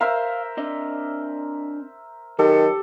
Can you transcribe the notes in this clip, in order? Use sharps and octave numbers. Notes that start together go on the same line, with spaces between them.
A#4 C5 E5 F5
C4 D4 D#5
F#2 D#3 G4 A4